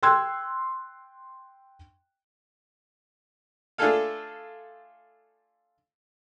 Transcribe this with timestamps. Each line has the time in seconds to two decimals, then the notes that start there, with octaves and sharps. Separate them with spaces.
0.03 G5 C6 E6 F#6 G#6
3.78 A3 D4 F4 G#4 A4 F5